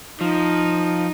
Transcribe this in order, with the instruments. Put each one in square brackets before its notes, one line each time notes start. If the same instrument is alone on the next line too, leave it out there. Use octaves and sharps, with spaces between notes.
[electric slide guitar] F3 [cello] D#4